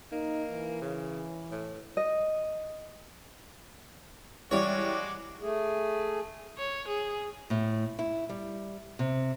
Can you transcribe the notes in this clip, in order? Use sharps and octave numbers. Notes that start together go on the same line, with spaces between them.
A#3 D#4
E3
C#3
A2
D#5
E3 G3 G#3 F#4 C#5 D5 D6
A3 G#4
C#5
G#4
A2
E4
G3
C3